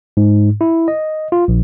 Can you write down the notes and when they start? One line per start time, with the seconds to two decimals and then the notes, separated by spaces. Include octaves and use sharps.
0.17 G#2
0.61 E4
0.88 D#5
1.32 F4
1.48 A#1